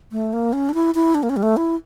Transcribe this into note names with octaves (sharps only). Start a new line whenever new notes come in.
A3
A#3
C#4
D4
E4
E4
D4
A#3
C#4
G3
A3
E4